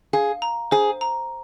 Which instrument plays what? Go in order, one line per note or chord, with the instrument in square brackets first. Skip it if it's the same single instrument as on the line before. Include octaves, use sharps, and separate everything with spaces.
[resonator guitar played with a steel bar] G#4 [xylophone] F5
[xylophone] A#5
[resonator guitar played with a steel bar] G#4 [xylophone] C5
[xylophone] A#5